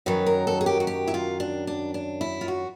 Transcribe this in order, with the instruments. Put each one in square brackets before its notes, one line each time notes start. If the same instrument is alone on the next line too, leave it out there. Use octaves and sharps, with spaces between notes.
[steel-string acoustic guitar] F#2 D#3 F#3 B4
A#4
A4
G#4
G4
F#4
G4
E4
F4
D4
D4
D4
E4
F4
F#4